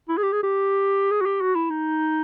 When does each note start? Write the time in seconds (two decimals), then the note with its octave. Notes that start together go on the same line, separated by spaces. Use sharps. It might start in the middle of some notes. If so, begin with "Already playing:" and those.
0.09 E4
0.17 G#4
0.23 G4
0.33 G#4
0.43 G4
1.11 G#4
1.21 F#4
1.26 G4
1.41 F#4
1.55 E4
1.70 D#4